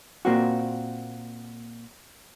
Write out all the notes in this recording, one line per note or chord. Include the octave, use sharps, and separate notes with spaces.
A#2 A#3 C4 F#4